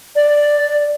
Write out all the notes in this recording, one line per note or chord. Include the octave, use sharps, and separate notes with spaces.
D5